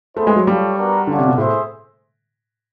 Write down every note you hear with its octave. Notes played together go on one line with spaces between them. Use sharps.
A3 B3 E4 G#4 C5
G#3
F#3
G3 F4 A4 C#5
B3 D4 F#4 A#4
D3 C#4 F4 A4 D5 F#5
C3
B2
A2 G#4 C5 E5